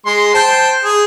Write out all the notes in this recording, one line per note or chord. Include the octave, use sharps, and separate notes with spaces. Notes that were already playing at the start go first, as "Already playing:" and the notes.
G#3 C6
C5 G5 A5
G#4